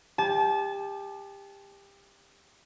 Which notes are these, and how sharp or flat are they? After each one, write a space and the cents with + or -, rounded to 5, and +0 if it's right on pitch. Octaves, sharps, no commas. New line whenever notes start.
G4 +25 A5 -30